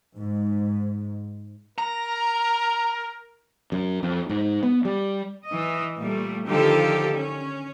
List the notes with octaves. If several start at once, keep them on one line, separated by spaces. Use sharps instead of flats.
G#2
A#4 A#5
F#2
F2
G#2
B3
G3
E3 D#5
A#2 G3 A3
D3 D#3 F3 F4 G4 A4
C#4